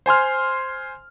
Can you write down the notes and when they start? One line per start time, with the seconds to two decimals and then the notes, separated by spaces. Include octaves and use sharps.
0.06 C5 G#5 C6 F6